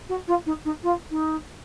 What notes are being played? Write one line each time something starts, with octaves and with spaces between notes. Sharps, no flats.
F#4
F4
D#4
D#4
F4
D#4